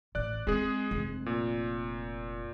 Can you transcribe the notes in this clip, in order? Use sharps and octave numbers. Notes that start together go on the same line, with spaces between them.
A1 D5 F#6
G#3 C4 G#4
F1
A#2